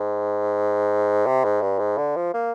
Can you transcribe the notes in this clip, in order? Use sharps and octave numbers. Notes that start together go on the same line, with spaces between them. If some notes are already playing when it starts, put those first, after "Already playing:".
Already playing: G#2
C3
G#2
G2
G#2
D3
F3
A#3